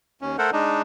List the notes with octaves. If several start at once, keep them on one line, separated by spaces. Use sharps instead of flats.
D#2 C#4
A3 A4 A#4 C5 F#5
G#3 D4 D#4